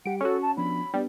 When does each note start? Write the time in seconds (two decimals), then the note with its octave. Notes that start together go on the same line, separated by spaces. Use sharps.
0.06 G3 G4 F#5 D7
0.21 C#4 F#4 A4 C#6
0.42 A5
0.57 F3 B3 D4 B5
0.94 G3 B3 D4